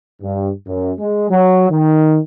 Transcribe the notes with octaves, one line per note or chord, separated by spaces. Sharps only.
G2
F#2
G#3
F#3
D#3